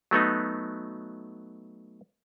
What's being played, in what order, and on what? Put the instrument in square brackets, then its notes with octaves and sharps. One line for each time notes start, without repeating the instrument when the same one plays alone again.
[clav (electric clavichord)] F#3 A3 B3 D#4